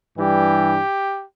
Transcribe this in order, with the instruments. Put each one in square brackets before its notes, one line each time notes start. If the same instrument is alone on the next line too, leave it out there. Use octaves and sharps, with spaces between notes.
[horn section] G2 E3 G3 G4